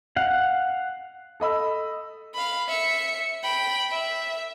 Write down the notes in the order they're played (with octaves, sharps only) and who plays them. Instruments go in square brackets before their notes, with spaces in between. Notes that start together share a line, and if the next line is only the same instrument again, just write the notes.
[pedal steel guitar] F5 F#5
[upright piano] A4 D#5 B5 E6
[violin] F5 B5
E5 C#7
G5 B5
E5